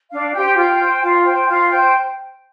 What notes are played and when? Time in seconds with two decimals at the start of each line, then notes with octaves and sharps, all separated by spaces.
0.11 D4 F5
0.34 G4 C5 G5
0.56 F4 G5
0.79 C5
1.02 F4 F5
1.25 C5 G5
1.48 F4 F5
1.71 C5 G5